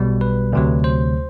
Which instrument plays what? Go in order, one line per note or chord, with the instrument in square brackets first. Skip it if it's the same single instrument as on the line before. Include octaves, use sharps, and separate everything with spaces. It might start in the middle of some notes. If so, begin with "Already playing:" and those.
Already playing: [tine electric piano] B1 B2 G3
B4
D2 C3 F#3
C5